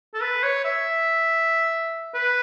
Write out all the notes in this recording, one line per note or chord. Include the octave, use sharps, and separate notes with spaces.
A4
B4
C#5
E5
B4